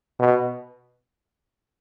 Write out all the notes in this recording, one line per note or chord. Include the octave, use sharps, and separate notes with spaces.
B2